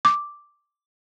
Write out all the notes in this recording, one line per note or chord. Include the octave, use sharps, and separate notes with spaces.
D6